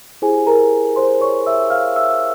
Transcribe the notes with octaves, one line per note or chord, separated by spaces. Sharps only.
E4 G4 G#4 C5 G#5
A#4 A#5
C5 C6
C#5 C#6
E5 E6
F5 F6
E5 E6